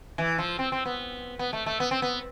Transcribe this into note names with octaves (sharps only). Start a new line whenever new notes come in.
E3
F3
C4
C4
B3
B3
A3
A3
B3
C4
B3